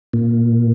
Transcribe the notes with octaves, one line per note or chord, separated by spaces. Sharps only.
A#2